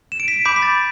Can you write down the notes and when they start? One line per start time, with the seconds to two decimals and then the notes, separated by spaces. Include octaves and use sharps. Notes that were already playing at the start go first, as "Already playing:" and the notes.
0.12 E7
0.20 D7
0.28 B6
0.36 D7
0.45 B5 D6 G6 B6
0.56 B6
0.62 A6